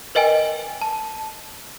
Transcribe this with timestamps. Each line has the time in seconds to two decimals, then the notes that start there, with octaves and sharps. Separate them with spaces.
0.15 A#4 B4 D#5 G5 G#5
0.82 A5